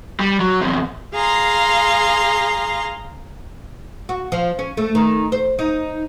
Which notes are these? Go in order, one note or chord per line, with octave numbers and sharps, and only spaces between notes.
G3
F#3
E2 C3
G#4 F5 A#5 C6
F#4
F3
C#4
A3
D#3
C5
D#4